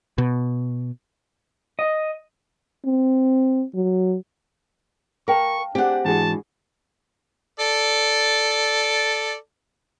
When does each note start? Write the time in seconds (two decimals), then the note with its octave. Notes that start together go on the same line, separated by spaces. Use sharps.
0.18 B2
1.79 D#5
2.85 C4
3.74 F#3
5.28 A#4 F5 G5 A5 C#6
5.75 C4 D4 G4 G#4 F#5
6.05 G#2 E3 D4 F#4 G#4 A5
7.60 A4 D5